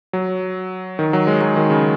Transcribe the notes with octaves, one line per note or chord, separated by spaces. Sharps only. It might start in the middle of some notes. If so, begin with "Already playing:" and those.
F#3
D#3
F#3
G#3
F#3
D#3
C#3